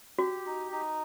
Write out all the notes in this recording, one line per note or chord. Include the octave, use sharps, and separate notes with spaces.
F#4 G4
D#4
D#4